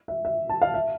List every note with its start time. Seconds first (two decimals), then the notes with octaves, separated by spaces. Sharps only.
0.08 E5
0.25 E5
0.49 A5
0.62 F5
0.74 E5